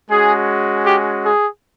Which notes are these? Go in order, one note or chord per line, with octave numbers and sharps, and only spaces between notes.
G#3 C#4 F#4 G#4
G4
G#4